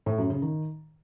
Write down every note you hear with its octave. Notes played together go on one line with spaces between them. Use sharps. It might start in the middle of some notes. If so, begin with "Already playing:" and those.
A2
F#2
C#3
D#3